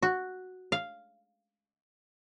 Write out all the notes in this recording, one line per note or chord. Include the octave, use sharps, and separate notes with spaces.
F#4
F5